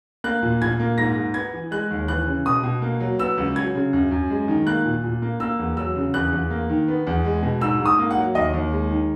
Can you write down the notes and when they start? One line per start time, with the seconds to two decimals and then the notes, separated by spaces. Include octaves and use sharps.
0.24 A#3 F#6
0.42 A#2
0.62 A#2 G#6
0.80 A#3
0.98 G#2 A#6
1.16 G#2
1.34 B3 G#6
1.53 E3
1.71 G#3 F#6
1.90 D#2
2.08 E3 F#6
2.26 C#3
2.45 B2 D#6
2.63 B2
2.82 A#3
3.00 F#3
3.19 B3 E6
3.38 C#2
3.56 F#3 G#6
3.75 C#3
3.93 F#2
4.11 F#2
4.30 G#3
4.48 D#3
4.66 A#3 F#6
4.85 A#2
5.04 A#2
5.22 A#3
5.40 A#3 E6
5.59 E2
5.77 F#3 E6
5.95 C#3
6.14 E2 F#6
6.32 E2
6.51 A#3
6.69 D#3
6.88 B3
7.07 E2
7.25 G#3
7.42 B2
7.61 G#2 E6
7.80 G#2
7.86 D#6
7.98 A#3
8.11 F#5
8.17 F#3
8.35 D#2 D#5
8.53 D#2
8.72 G#3
8.91 D#3